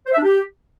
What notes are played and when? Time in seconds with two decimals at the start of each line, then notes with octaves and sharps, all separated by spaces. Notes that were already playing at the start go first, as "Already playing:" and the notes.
0.07 C5
0.12 E5
0.18 D4
0.23 G4